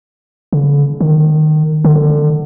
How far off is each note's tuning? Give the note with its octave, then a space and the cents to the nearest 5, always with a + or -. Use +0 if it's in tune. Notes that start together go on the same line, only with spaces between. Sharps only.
D3 -45
D#3 -20
D3 +25